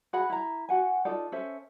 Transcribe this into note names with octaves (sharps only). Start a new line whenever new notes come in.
F#4 G#4 F#5 B5
E4 A#5
F#4 F#5 G#5
D#4 F4 A4 D5
C#4 A4 C5 E5